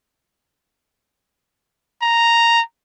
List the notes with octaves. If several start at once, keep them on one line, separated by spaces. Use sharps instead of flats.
A#5